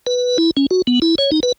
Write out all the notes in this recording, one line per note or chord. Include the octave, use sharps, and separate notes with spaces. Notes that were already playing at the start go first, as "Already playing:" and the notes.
B4
E4
C#4
F#4
B3
E4
C#5
D#4
B4